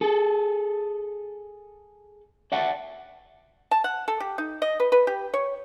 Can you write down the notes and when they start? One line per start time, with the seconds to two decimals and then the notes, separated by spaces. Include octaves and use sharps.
0.01 G#4 A4
2.52 D5 E5 F#5 A5
3.71 A5
3.84 F#5
4.08 A4
4.20 G4
4.38 D#4
4.62 D#5
4.80 B4
4.92 B4
5.07 G4
5.34 C#5